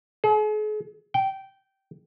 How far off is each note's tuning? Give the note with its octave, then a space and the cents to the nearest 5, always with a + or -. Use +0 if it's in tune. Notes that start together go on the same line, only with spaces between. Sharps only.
G#4 +45
G5 -15